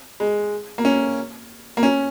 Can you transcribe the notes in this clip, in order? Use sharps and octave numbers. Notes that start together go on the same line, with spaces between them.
G#3
A#3
C#4
A#3
C#4